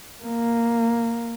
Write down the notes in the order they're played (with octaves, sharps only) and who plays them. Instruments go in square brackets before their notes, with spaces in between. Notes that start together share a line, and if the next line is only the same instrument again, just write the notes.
[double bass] A#3